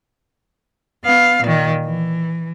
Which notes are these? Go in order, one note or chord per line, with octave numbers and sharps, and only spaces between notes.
B3 F5
A#2 D#3
E3